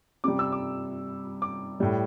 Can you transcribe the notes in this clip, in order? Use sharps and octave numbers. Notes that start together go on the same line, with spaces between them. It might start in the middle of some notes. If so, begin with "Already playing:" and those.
C3 G3 D6
E6
D6
D6
A2 G3